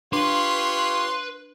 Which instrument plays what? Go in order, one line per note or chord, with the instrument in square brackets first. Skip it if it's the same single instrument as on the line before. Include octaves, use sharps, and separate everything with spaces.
[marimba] D4 [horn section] F4 G4 C#5 [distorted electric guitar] B4 [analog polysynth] C6